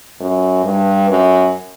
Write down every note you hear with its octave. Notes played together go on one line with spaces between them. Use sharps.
F#2
G2
F#2